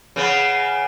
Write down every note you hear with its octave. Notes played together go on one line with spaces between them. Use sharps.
C#3 B3